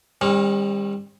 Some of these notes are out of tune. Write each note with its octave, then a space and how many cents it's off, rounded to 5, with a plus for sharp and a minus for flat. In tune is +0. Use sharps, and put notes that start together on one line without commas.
D#3 +0 G3 +35 C#4 -40